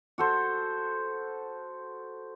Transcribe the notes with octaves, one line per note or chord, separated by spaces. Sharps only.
F#4 A4 C5